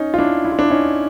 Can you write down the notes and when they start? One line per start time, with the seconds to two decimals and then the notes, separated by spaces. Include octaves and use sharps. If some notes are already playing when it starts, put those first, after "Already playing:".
Already playing: C#4 D#4
0.14 F4
0.19 D4 E4
0.45 E4
0.52 F4
0.59 D4 E4
0.70 C#4 D#4